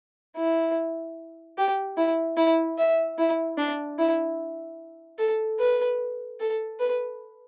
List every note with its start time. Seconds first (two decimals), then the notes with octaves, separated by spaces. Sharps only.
0.37 E4
1.58 G4
1.97 E4
2.37 E4
2.78 E5
3.18 E4
3.58 D4
3.99 E4
5.18 A4
5.59 B4
6.40 A4
6.80 B4